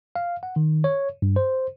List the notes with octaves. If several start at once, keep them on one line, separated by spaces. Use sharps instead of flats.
F5
F#5
D#3
C#5
G2
C5